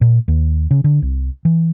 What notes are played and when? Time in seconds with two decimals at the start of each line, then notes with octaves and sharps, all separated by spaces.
0.01 A#2
0.28 D#2
0.71 C#3
0.84 D3
1.02 C2
1.45 E3